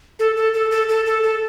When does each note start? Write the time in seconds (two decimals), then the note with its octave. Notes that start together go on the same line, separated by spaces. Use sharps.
0.19 A4
0.37 A4
0.54 A4
0.71 A4
0.89 A4
1.06 A4
1.23 A4